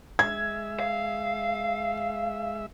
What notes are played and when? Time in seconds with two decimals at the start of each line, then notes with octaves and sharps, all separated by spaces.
0.19 G#3 E5 G#6
0.80 F5